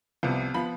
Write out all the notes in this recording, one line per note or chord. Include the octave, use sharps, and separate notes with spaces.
C2 C3 F3 B3
F3 B3 B5